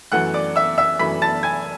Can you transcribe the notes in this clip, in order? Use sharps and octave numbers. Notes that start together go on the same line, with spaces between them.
F#2 E3 A3 F#5 F#6
D5 D6
E5 E6
E5 E6
F#2 E3 A3 B5 B6
A5 A6
G#5 G#6